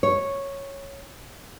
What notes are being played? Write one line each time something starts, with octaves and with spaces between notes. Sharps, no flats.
C#5